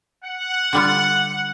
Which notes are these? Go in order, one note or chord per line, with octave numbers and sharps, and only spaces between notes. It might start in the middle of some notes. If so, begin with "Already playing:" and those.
F#5
D3 G3 F4